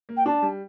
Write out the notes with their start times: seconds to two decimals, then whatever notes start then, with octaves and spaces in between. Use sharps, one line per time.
0.09 A#3
0.16 G5
0.26 D4 A5
0.42 G3